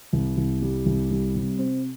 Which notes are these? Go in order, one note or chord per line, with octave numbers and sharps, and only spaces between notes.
C2
C2
G3
C2
G3
C3
C4